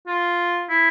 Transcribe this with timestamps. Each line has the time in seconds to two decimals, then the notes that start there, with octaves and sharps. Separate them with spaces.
0.08 F4
0.70 E4